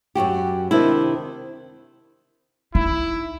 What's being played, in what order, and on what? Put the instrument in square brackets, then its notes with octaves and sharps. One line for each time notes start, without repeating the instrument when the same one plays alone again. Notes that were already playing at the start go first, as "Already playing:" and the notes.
[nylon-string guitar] F#2 B2 F#4 G4
C3 D#3 D4 E4
[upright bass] D#4 [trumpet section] E4